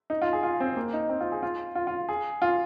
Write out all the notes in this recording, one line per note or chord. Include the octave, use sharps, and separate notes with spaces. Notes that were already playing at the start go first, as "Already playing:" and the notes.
D#4
F4
G#4
F4
C4
A#3
D#4
C4
F4
G#4
F4
F4
F4
G#4
F4